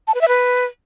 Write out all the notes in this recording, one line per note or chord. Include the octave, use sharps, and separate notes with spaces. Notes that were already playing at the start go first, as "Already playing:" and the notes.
A5
B4
E5
B4